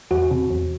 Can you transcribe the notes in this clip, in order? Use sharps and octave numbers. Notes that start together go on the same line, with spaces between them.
E2 F#4
C3
E2